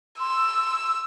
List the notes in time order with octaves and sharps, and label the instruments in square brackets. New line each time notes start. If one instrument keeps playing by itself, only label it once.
[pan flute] C6 [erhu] E6